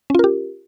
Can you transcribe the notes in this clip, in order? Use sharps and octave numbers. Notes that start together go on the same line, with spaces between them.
C#4 F4 G4 A#4